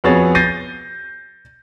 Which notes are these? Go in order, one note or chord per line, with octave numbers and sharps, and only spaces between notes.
F2 B3 F#4 G#4 C#5 A6
G6 A6 A#6 C7 D#7